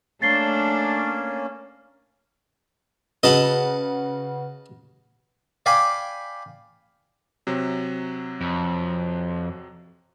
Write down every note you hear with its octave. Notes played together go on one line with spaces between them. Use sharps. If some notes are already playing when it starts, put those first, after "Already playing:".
A3 A#3 C#4 D4 A6 C7 G7
C#3 F#4 B4 D#5 F#5 A5 B5
D5 F5 G5 G#5 B5 D6
C3 F#3
F2